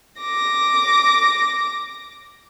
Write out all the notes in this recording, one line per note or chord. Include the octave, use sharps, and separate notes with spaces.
D6 A#6